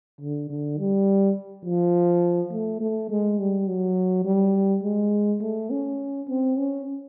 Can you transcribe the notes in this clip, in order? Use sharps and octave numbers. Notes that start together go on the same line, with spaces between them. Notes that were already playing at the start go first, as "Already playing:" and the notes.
D3
D3
G3
F3
A3
A3
G#3
G3
F#3
G3
G#3
A3
C#4
C4
C#4